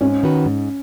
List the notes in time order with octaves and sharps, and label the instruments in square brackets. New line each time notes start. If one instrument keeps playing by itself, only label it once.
[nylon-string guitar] G#2 [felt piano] C#4
[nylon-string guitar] D#3 B3 F#4 B4
G#2